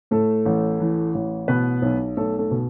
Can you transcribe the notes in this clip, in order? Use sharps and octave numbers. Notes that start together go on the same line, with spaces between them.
A2 A3 A4
A1
E3
A1
B2 B3 B4
B1
B1 A3 A4
A3 A4
B2